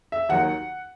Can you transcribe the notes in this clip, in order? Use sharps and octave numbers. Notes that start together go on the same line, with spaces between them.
E5
D#2 D#3 F#3 F#5